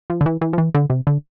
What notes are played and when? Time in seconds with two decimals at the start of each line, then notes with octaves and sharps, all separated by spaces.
0.10 F3
0.21 D3
0.26 E3
0.41 E3
0.53 F3
0.58 E3
0.75 D3
0.90 C3
1.07 D3